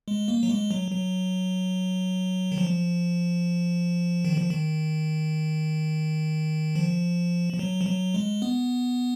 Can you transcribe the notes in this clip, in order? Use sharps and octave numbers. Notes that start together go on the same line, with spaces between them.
G#3
A#3
F#3
G#3
F#3
F#3
D#3
F3
D#3
F3
D#3
F3
F3
F#3
F3
F#3
G#3
B3